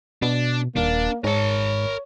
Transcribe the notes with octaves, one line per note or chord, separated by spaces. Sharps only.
B2 D4
D#1 A#3 D4
G#2 A#4 C#5 A5